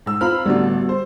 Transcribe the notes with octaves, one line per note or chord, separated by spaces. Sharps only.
G#2 E6
C4 F4 A#5 B5 F6
A1 D3 G3 B3 D4 F#4
C5